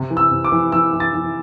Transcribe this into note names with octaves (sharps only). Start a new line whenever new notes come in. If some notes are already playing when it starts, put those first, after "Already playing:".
Already playing: C3
E3
E6
C3
D6
E3
E3 E6
E3
A6
E3